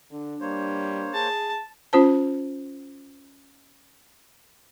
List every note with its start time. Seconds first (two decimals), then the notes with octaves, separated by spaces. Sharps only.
0.11 D3 D4
0.41 G3 A#3 C5 C#5
1.13 G#4 A5
1.93 C#4 F4 C5 A5